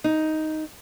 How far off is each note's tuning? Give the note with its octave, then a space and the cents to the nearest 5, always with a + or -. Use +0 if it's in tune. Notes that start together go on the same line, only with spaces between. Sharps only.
D#4 +5